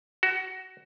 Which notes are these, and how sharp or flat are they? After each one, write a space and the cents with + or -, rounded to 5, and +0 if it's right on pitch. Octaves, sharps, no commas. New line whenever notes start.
F#4 +20